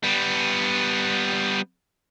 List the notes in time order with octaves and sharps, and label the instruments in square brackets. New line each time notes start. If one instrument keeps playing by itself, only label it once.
[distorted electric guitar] G3 B3